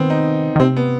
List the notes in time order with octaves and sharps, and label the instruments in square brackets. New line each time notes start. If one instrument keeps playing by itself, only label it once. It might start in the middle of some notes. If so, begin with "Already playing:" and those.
Already playing: [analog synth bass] D#3 [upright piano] B3 C4
[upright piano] D#4
[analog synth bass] D#3
[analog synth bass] C3 [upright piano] C4
[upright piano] B3